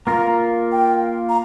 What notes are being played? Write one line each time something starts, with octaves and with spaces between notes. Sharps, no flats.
A#3 F4 A#4 A#5
G5
A#5